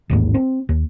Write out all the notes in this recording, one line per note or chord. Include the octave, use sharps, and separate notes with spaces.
A1 D#2 G#2
C4
D#2